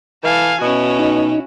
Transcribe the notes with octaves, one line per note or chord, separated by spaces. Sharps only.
E3 A4 F5 G#5
B2 C#4 E4 F#4
D#4